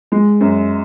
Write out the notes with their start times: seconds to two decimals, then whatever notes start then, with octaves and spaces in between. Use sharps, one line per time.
0.12 G#3
0.41 F#2